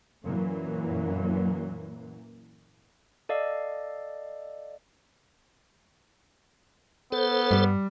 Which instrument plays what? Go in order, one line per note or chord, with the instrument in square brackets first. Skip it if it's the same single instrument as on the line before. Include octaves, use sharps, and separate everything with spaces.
[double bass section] F#2 A#2 E3 F#3 A#3
[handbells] A4 D5 D#5 F5
[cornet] B3 [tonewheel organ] A4 C5
[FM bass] G2 [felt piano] G3